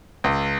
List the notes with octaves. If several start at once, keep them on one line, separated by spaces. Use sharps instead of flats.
C#2